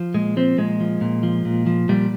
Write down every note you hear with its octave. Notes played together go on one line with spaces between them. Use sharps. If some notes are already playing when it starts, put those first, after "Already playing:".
Already playing: F3
A#2 G#3
F3 C4
A#2 G#3
F3
A#2
F3
A#2
F3
A#2 G3